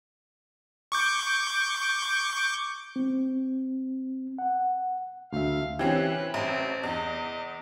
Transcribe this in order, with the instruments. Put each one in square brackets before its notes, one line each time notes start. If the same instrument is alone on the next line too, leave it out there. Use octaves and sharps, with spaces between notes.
[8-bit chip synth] C#6 D6 G6
[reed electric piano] C4
F#5
[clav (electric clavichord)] D2 E5 [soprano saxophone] F5
[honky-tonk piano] E3 C4 C#4 [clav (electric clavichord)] G4 [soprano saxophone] B4
[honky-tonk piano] A1 [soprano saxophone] C4 [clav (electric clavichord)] E5
[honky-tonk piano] E2 [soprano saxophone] D#5